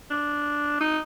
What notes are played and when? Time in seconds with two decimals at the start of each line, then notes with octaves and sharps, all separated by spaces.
0.11 D4
0.81 D#4